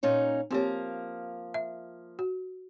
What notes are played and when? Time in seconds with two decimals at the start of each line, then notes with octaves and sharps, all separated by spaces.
0.03 A#2 C#4 D#4
0.51 F3 A#3 C4 G4 C#5
1.54 E5
2.19 F#4